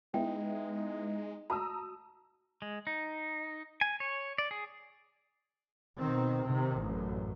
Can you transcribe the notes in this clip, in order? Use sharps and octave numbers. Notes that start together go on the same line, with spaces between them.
G#3 B3 D#4 E4 G5
F#4 A5 A#5 D#6 E6
G#3
D#4
G#5
C#5
D5
G#4
B2 D#3 C4
C3 D#3
A1 F#2